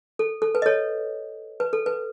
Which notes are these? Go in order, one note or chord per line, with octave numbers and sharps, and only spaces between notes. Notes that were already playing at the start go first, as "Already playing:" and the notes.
A4
A4
B4
D#5
A4 C#5
B4
A4
B4